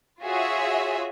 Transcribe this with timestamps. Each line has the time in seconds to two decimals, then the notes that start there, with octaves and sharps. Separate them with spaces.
0.22 F4 F#4 G#4 C#5 E5